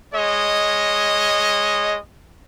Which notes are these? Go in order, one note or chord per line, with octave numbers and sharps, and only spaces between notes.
G#3 C#5 D#5